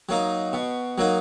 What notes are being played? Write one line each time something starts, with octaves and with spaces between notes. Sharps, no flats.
F#3 A#3 D#4
B2
F#3 A#3 D#4